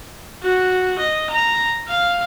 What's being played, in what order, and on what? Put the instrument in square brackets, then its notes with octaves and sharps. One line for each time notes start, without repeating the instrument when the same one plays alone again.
[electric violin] F#4
D#5
A#5
F5